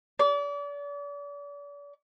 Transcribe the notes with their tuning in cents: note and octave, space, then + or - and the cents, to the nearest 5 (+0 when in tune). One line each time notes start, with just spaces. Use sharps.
D5 -40